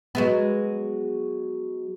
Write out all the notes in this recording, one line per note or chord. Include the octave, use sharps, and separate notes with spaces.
F#3 G#3 B3